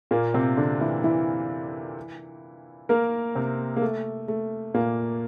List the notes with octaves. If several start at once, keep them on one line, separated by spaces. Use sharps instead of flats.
A#2 A#3
C3 C4
D3 D4
E3 E4
E3 E4
A#3 A#4
C3 C4
A#3
A3
A3
A#2 A#3